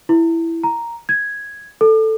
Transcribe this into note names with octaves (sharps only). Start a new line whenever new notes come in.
E4
A#5
G#6
A4